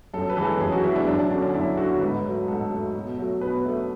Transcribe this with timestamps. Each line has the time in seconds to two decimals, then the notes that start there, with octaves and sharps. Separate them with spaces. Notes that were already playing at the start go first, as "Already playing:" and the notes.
0.14 F#2 A4
0.30 B4
0.37 E3 G#3
0.45 A4
0.60 F#2 G#4
0.72 F#4
0.84 E3 G#3 E4
0.96 D4
1.07 F#2 D4
1.19 D4
1.31 D3 F#3 C#4
1.42 D4
1.54 F#2 E4
1.77 D3 F#3 F#4
2.01 G#2 B4
2.24 F#3 A3
2.47 G#2 A4
2.71 F#3 A3
2.95 B2
3.18 F#3 A3
3.41 B2 B4
3.65 F#3 A3